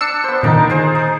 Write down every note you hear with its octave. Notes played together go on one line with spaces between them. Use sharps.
D4 E6 C#7
B3 C5
A#2 D3 D#3 D#4 A#4 D5
G#4 C5
D#4 D#6